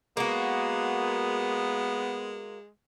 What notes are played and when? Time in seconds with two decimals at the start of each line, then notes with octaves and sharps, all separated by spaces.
0.17 G#3 A#3 B3 F#4